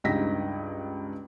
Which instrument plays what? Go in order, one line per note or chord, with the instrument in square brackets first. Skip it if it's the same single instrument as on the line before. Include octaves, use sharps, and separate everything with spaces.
[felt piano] C#2 G2 D#4 D#5 A#6 B6